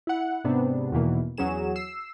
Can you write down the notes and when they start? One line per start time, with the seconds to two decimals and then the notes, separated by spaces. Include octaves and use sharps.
0.07 E4 F#5
0.44 G#2 C3 B3 D4
0.92 E2 B2 D#3 E3 A#3
1.38 E2 F#3 C#4 G#4 E7
1.76 E6 C7